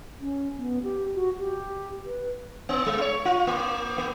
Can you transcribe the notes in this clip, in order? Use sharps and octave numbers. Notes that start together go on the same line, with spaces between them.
C#4
B3
G4
F#4
G4
B4
B3
G#3
C#5
F4
A#3
A#3